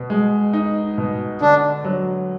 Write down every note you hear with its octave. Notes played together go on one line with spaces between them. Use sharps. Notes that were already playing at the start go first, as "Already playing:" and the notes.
Already playing: B2
G#3
D#4
B2
D3 D4
F#3